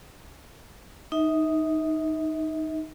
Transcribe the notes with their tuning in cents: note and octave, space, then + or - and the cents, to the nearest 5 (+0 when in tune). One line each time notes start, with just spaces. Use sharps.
D#4 +0 E5 -40